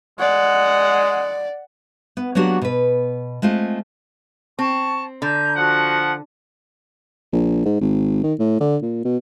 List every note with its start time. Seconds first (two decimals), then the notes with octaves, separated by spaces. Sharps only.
0.19 G#3 D5 F#5
2.17 B3
2.35 F#3 A#3 B3 D4 F#4 G4
2.62 B2 B4
3.42 G#3 A3 C4 F4
4.59 C4 A5 C#6
5.22 D3 A#5 G6
5.57 F3 F#4 F#5
7.32 A#1
7.65 G#2
7.81 G#1
8.24 D#3
8.39 A2
8.60 D3
8.82 A#2
9.05 B2